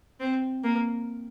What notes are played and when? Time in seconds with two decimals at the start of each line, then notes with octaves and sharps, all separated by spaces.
0.20 C4
0.64 A#3